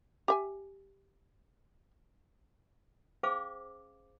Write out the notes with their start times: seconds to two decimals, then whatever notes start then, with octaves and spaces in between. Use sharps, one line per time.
0.28 G4 E5 G#5
3.23 C#4 G#4 C5 F5 D6